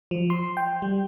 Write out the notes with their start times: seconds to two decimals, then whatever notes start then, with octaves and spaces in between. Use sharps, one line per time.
0.11 F3
0.30 C6
0.57 G5
0.82 G3